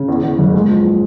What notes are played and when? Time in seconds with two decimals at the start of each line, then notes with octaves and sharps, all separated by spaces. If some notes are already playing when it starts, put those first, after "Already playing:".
Already playing: C#3
0.08 E2
0.23 E2
0.38 F#1
0.54 G#3
0.69 F3
0.84 A#2